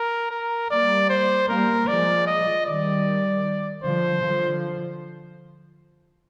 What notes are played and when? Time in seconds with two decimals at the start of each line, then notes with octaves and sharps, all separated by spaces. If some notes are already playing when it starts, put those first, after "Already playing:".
Already playing: A#4
0.31 A#4
0.70 G3 A#3 D5
1.10 C5
1.48 G3 A#3 A#4
1.87 F3 G#3 D5
2.27 D#5
2.66 D#3 G3 D5
3.84 D3 F3 C5
4.22 D3 F3